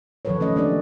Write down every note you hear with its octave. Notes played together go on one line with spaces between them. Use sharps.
D#3 F3 F#3 A4 B4 C#5
A3 C#4 A4 D#5
A#3 D4 G4 D5